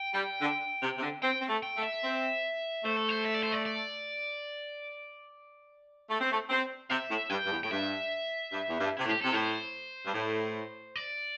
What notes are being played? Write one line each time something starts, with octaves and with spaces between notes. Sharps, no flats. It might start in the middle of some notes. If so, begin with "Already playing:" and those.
Already playing: G5
G3
D3
C3
C3
D3
C4 G5
C4
A3
G5
A3
E5
C4
A3 C5
A4
C5
E5
D5
C5
D5
D5
A3
C4
A3
C4
C3 E5
A2
G2 G5
G2
E2
A2 G5
G2 E5
G2
E2
G2
C3 E4
A2
G4
C3 A4
A2 C5
G2
A2
D5